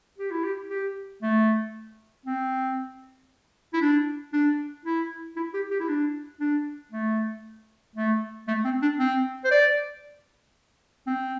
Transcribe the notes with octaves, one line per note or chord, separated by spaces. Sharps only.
G4
E4
G4
G4
A3
C4
E4
D4
D4
E4
E4
G4
G4
E4
D4
D4
A3
A3
A3
C4
D4
C4
C5
D5
C4